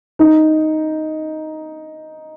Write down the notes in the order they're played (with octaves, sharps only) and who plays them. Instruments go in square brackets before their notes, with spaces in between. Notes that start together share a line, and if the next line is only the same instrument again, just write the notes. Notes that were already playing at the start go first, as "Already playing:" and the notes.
[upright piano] D#4